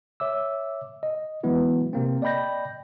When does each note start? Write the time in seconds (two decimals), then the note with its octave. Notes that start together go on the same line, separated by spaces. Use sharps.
0.20 C#5 E5 D6 E6
1.03 D#5
1.43 E3 F#3 G#3 B3 E4 F#4
1.93 C3 A#3 C4
2.22 D5 D#5 G5 B5 G6 A#6